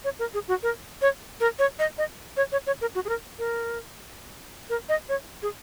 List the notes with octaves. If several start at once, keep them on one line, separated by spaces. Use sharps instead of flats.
C#5
A#4
G#4
F#4
A#4
C#5
A#4
C#5
D#5
D#5
C#5
C#5
C#5
A#4
F#4
G#4
A#4
A#4
A#4
D#5
C#5
G#4